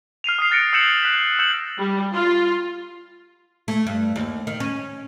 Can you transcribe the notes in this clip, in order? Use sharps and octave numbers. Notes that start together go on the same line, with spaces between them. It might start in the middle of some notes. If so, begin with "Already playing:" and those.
F6 C7 D#7 F7
D#6 F6 C7
F#6 A6 A#6 C#7 D7
E6 G6 C#7 E7 F#7
F#6 B6
E6 G6 C#7 E7 F#7
G3
F4
A3
G2
D#2
D#3
C#4